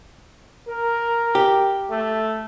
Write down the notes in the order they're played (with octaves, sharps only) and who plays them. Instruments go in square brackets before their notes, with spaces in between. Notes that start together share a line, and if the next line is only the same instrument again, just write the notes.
[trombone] A#4
[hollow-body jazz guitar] G4
[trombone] A3